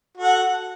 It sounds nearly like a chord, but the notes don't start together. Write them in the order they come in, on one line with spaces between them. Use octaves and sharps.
F#4 A4 F#5